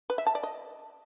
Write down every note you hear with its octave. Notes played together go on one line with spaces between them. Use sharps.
B4
E5
A5
D5
D#5